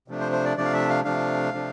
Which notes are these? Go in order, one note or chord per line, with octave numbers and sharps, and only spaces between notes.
C3 F3 A3 D4
C5
C5
D5
C3 F3 A3 D4 D5
F5
E5
F5
C3 F3 A3 D4 F5
C3 F3 A3 D4